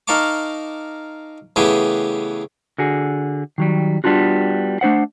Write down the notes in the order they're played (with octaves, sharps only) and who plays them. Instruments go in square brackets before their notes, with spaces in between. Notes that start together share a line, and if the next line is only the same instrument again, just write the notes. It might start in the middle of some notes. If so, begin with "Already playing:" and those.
[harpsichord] D#4 A#4 F5 A5 C#6 D6
C#3 E3 A3 B3 G4 G#4
[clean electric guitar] D3 F#4 G#4
D#3 F#3 G3
G3 B3 D4 F4 F#4
A3 D4 C5 F#5